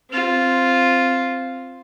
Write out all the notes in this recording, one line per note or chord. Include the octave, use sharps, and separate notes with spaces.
C4 F4